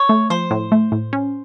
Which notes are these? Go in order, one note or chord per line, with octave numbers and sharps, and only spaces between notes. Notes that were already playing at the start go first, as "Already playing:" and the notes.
Already playing: C#5
A3
F3 C5
A2
A3
A2
C#4